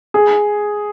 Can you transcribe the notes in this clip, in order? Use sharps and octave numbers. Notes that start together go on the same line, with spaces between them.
G#4